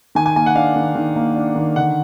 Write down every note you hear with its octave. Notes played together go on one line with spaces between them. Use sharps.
D#3 G#5
G#5
A#3 G#5
F#5
D4 F5
D#3
D#3
A#3
D4
D#3
D3 F#5